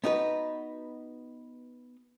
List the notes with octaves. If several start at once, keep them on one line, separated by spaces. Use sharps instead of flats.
B3 D#4 F#4 B4